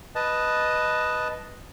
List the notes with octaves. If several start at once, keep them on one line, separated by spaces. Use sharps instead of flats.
B4 D#5 A5